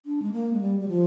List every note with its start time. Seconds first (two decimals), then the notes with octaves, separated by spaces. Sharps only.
0.06 D4
0.22 G#3
0.33 A#3
0.53 G#3
0.61 G3
0.80 G3
0.88 F3